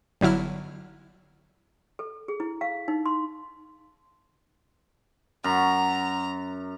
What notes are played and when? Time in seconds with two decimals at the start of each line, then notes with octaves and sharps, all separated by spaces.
0.21 G1 D3 F#3 E4 F6
1.99 A4
2.28 G#4
2.40 E4
2.61 F5
2.88 D#4
3.06 C6
5.44 F#2 A#5